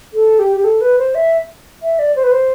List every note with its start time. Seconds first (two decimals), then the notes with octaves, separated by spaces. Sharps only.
0.13 A4
0.39 G4
0.57 G4
0.64 A4
0.81 B4
0.98 C5
1.15 E5
1.82 E5
1.99 D5
2.16 C5
2.24 B4
2.32 C5